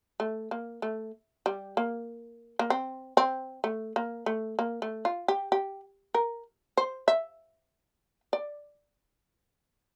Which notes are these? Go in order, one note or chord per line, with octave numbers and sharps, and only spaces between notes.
A3
A#3
A3
G3
A#3
A#3
C4
C4
A3
A#3
A3
A#3
A3
F4
G4
G4
A#4
C5
E5
D5